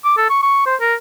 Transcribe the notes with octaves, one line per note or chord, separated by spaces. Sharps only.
D6
A4
C#6
C#6
C5
A#4